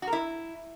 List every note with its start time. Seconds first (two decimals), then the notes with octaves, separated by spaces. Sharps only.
0.02 F#4
0.07 A#4
0.12 E4